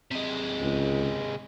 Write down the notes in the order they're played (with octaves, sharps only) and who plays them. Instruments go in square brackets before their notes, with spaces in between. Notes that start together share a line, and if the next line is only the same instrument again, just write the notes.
[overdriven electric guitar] C3 G#3
[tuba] C#2